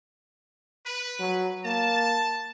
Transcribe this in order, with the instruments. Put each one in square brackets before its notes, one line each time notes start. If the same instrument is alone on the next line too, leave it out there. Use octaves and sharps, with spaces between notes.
[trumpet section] B4
[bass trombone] F#3
[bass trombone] A#3 [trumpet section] A5